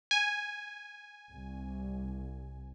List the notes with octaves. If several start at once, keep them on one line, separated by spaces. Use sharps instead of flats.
G#5
C2